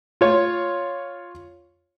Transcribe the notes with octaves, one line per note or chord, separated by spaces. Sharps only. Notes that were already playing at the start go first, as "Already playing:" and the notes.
F4 C#5